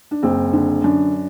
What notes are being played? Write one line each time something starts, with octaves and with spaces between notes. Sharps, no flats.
D4
F#1 C4
D3
F#2 D4